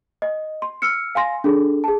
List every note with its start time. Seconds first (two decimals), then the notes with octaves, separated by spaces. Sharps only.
0.22 D#5
0.62 C6
0.82 E6 F6 C#7
1.15 F5 G#5 C6 A#6
1.44 D4 G#4 A4
1.84 G#4 A5